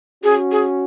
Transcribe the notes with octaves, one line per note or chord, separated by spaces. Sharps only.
C#4 F#4 G#4
G#4